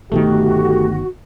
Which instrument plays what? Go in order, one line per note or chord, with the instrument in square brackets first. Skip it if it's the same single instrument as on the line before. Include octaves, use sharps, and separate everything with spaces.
[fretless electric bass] G1 B2 D#3 [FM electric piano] A3 [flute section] F#4 [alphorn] G4